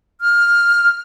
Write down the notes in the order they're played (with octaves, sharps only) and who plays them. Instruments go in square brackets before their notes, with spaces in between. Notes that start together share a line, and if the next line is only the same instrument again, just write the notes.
[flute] F6